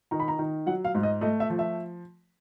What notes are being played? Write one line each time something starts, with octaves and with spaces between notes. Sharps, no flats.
D#3 A#5
B5
A#5
D#3
F#3 F#5
F5
G#2
D#5
A3 D#5
E5
F3
E5